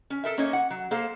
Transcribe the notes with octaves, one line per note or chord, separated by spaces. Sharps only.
C#4
A4 A#4 E5
A#3 C#4 D#4 C#5
F#5
F#3
A#3 A4 C5 F5